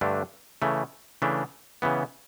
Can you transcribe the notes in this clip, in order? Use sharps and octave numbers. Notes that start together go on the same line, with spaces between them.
G2 D3 A3 D4
C#3 E3 A3
C#3 E3 A3 D4
C#3 E3 B3